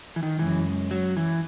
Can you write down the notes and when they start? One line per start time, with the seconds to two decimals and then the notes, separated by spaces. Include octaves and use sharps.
0.16 E3
0.23 D#3
0.39 F#2 C#3 E3 G#3
0.91 F#3
1.17 E3